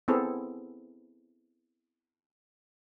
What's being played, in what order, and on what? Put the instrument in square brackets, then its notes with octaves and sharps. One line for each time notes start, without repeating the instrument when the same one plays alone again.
[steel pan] B3 C4 E4 G#4 A4